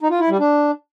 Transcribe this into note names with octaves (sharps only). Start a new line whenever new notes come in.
D#4
F4
E4
G3
D4